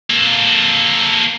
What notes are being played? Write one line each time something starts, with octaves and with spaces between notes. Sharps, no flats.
A#3 A4